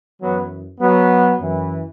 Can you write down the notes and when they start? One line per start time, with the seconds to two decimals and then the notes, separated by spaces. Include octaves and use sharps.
0.21 F#2 E3 F#3 B3
0.80 F#3 B3
1.40 F#2 E3